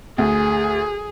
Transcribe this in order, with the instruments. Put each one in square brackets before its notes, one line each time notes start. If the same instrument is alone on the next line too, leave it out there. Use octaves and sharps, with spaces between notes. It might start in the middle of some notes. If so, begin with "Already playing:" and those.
[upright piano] D2 [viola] G#4